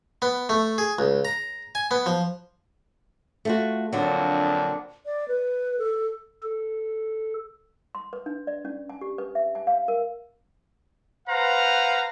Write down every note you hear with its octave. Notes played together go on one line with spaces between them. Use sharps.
B3
A3
G#4
C#2
A#5
G#5
B3
F3
A3 F4 F#4
F2 A#2 D3 F#3 D4
D5
B4
A4
A4
C6
B4
D4
D5
C#4
G#5
G4
B4
E5
G#5
F5
A#4
B4 C5 F5 F#5 A#5